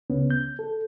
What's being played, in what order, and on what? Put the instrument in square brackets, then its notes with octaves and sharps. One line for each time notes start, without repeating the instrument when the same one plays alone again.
[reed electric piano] C#2 C#3 B3 C#4
G6
A4